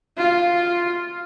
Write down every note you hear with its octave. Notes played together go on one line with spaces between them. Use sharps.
F4